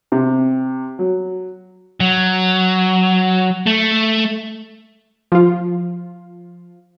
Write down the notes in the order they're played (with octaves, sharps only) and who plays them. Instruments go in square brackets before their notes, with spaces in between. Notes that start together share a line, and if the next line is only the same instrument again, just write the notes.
[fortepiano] C3
F#3
[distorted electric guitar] F#3
A3
[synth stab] F3 F4